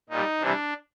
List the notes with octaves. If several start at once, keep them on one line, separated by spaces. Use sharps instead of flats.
A#2 G3 D#4
C3 E3 G3 D4